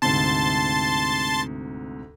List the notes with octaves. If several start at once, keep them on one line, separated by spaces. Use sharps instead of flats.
D2 G#2 C3 A5 C6 A6